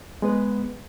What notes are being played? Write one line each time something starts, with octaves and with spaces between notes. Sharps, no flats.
G#3 B3 B4